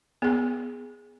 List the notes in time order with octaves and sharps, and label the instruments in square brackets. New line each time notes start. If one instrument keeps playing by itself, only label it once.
[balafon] B3 G#4